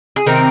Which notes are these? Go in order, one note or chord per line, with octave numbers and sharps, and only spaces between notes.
G#4
C3 D#3 C4 A#4